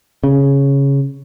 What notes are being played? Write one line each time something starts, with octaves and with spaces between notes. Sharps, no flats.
C#3